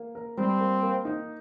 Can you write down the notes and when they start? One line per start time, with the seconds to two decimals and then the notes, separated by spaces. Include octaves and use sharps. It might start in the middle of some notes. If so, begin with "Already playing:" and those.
Already playing: A#3
0.15 A#4
0.38 G3 C4
0.60 A#3
0.82 A#3
1.05 D#4